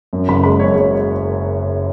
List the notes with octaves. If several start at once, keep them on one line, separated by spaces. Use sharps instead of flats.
F#2
F#1 B5
G#3 B5
F#2 C#5
G#3 C#5